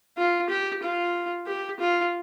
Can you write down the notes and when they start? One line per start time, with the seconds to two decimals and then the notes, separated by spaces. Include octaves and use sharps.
0.18 F4
0.50 G4
0.83 F4
1.47 G4
1.80 F4